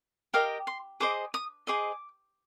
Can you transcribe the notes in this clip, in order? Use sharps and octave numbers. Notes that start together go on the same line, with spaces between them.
G4 A#4 D#5 F5
C6
G#4 C5 D#5 D6
D#6
G#4 C5 D#5 D6